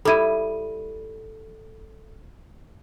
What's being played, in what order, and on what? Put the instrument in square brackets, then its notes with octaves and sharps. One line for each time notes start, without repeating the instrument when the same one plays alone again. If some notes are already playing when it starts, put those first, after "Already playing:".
[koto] G3 E4 [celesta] A4 D#7